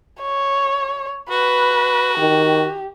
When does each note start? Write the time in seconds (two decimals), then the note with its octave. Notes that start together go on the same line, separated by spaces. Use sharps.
0.22 C#5
1.30 F#4 B4
2.18 D#3 G4